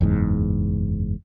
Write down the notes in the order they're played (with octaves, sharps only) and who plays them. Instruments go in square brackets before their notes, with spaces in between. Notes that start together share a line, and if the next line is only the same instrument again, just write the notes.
[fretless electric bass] F#1 E2 G#2